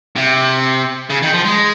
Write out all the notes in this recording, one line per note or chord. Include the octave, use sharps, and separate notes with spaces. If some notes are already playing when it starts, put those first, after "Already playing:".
C3
C#3
D#3
F3
G#3